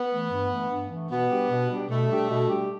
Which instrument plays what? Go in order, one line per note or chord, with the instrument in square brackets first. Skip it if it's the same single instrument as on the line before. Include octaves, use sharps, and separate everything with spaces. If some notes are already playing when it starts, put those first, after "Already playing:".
Already playing: [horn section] B3
[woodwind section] E3 A3
G2
E3 A3
G2
E3
A3
[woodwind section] B2 [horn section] B3
[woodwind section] G3 D4 G4
B2
G3 D4 G4
[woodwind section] B2 [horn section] A3
[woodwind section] G3 D4 G4
B2
G3 D4 G4